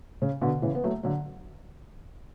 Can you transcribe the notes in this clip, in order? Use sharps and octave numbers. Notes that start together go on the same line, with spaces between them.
C#3
B2 D3
C#3 E3
B3
F#3 A3
D3 F#3